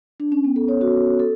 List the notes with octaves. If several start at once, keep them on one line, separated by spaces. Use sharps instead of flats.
D4
C#4
B3
A4
C#5
F#4
A4